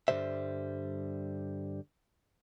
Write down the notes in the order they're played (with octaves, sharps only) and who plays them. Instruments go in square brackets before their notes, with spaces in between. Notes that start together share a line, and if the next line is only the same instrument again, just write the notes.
[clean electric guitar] G2 D3 E3 G3 C5 E5